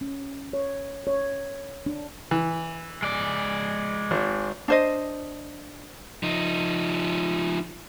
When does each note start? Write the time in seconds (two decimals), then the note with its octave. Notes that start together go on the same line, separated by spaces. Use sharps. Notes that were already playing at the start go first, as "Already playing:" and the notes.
0.01 C#4
0.53 C#5
1.07 C#5
1.86 D4
2.31 E3
3.03 G#3 D5
4.11 G#1
4.68 D4 C5 D#5
6.23 F3 D#4